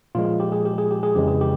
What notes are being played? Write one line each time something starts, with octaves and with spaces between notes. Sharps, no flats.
A#2 F3 G#3 F4
G4
G#4
G4
G#4
G4
G#4
F2 C#3 E3 G#3 G4
G#4
G4